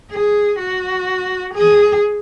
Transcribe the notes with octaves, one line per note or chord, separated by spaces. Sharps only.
G#4
F#4
G#4